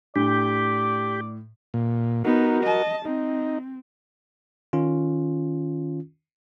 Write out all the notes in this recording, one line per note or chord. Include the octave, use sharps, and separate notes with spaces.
A2 D4 G4 D5
A#2
B3 D#4 F#4 A#4
D#5 A5
C4 D#4
D#3 C#4 F4